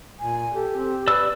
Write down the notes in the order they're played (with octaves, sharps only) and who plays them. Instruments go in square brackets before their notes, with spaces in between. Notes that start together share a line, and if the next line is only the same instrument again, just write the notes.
[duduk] A#2 [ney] G#5
[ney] G4 [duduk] A4
[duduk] C4
[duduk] B4 [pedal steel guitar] D5 E6